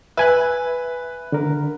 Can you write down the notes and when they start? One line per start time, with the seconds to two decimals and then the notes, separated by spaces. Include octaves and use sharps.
0.17 B4 E5 G#5 F#6
1.32 D3 A#4